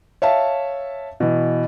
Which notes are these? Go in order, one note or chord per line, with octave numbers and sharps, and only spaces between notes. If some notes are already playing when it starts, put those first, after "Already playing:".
C#5 E5 F5 A5
B2 E3